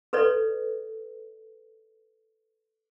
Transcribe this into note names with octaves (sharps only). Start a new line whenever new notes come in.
A4 B4 C#5 D5